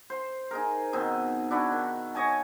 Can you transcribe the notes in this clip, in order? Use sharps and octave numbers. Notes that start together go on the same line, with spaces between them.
C5
D#4 G#4 A#4
B2 D#3 C4 D#4
D4 E4 F#4 B4
D#3
C#5 D#5 G#5 A5